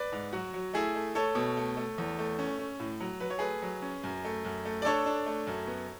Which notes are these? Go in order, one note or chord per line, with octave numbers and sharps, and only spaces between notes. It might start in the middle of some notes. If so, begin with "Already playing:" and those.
Already playing: B4 D5
G#2
F#3 F#4
F#3
A3 E4 G#4
A3
A3 A4 C#5
B2
A3
A3
E2
A3
C#4
C#4
A2
F#3
F#3 B4
C#5
A3 G#4 B4
F#3
C#4
F#2
A3
F#2
A3
D5
D4 A4 C#5
D4
A3
F#2
B3